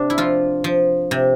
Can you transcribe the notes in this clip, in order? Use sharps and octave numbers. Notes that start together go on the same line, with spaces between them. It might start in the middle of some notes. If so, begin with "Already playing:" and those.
Already playing: C3 D4
E4
F3 F4
F3
C3